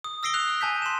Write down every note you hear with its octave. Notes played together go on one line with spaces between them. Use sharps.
D#6
D#6 E6 A#6 C7 D7 G7
F#6 F7
G#5 A5 G6 B6
C6 E7